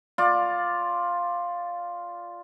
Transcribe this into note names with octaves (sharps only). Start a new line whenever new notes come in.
F4 D5